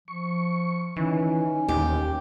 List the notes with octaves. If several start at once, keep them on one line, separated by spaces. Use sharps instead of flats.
F3 C#6
D#3 E3 C#4
D#2 G4